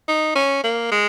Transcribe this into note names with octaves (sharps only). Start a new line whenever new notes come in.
D#4
C#4
A#3
G#3